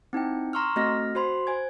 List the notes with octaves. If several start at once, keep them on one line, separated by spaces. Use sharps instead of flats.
C4 D#4 E4 G5
A#5 C6 C#6 E6 F6
A3 C4 F#4 D#5 F6 A#6
F#4 C5 B5 C6
C5 G#5 G#6